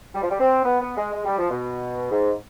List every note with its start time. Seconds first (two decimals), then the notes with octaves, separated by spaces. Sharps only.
0.14 G3
0.23 F3
0.31 G3
0.39 C4
0.64 B3
0.81 B3
0.97 G#3
1.13 G#3
1.25 G3
1.38 F3
1.50 B2
2.11 G#2